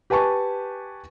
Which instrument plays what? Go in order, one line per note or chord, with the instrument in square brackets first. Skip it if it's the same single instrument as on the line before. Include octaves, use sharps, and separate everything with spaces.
[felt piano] G4 B4 G#5 A5 C#6